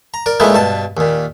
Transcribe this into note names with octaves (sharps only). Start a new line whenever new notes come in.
A#5
A#4 D5
A#2 G#3 A3 B3 D#4 E4
G2 B2 A5
D#2 A#2